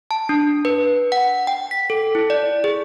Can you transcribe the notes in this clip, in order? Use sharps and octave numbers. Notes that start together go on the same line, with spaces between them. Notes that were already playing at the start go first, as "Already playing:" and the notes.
A5
D4
B4
F#5
G5
B6
A4
E4
D5
G#4